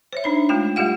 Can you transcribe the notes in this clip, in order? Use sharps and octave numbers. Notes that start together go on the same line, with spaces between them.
C5 C#5 E5
D4 D#4 B5
G#3 A3 F4 G5
G3 A3 F4 G4 F5 F#5